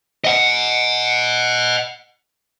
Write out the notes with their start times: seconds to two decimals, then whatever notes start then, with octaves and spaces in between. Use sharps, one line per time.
0.24 D#5 F#5